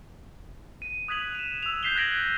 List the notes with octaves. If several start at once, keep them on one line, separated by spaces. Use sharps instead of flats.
D#7
D#6 F#6 G#6 B6 F7 F#7
D#7 E7
E6 F7
G6 B6 C7 E7 G7
F#6 G#6 A#6 D7 F#7